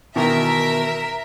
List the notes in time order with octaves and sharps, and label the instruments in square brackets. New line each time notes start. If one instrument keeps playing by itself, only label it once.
[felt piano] B2 D#3 E3 [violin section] A#4 E5